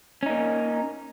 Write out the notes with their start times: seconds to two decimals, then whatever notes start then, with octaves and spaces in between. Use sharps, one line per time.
0.23 C#4
0.26 D#4
0.30 A#3